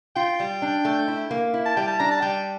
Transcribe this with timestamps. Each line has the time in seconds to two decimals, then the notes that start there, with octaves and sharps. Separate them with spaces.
0.16 F4 G5
0.40 G3
0.62 D4
0.85 A3
1.08 E4
1.31 A#3
1.54 E4
1.66 A5
1.77 G3 G5
1.88 A5
1.99 D4 A#5
2.11 A5
2.22 G3 G5